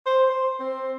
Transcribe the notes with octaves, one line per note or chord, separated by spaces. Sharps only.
C5
C5
C4